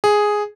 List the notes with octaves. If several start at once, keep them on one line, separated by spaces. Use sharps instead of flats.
G#4